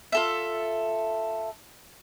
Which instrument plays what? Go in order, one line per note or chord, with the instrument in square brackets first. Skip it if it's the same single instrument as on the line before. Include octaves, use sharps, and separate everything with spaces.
[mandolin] F4 A4 E5